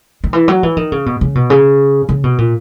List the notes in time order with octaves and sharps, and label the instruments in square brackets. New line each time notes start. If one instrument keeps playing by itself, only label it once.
[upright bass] D#3
E3
F#3
E3
D#3
C#3
B2
C#3
B2
C#3
C#3
B2
A#2